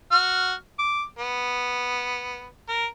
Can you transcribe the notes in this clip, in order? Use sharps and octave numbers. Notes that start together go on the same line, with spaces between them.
F#4 F6
D6
B3
A#4